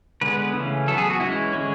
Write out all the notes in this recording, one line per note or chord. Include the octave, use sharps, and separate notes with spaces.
D3 G#3 B3 B4
C#3 E3 A3 C#4
F#3 B3 A4
G#4
F#4
E3 G#3 C#4 E4
D3 G#3 C#4